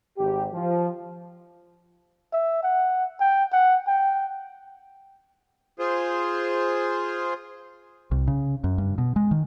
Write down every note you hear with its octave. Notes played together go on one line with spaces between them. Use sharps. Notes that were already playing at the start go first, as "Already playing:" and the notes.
G#1 G4
F3
E5
F#5
G5
F#5
G5
F4 G#4 C5
C2
C#3
F#2
G2
B2
G#3
D#3